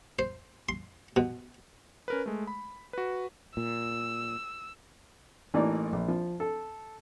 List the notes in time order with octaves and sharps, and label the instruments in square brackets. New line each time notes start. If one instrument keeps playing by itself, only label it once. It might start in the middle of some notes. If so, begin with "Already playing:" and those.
[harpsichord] C5
C6
B2
[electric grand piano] C#4 A#4 B4
G#3 A3
B5
F#4 B4
[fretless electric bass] A#2 [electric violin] E6
[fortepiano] A1 E3 A3 A#3 D#4 D5
A#1
F3
A4